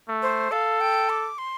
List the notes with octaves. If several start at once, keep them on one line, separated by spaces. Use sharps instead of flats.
A3
C5
A4 F5
G5
D6
C6